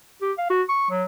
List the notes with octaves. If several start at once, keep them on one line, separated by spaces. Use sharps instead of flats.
G4
F5
F#4
C#6
F#3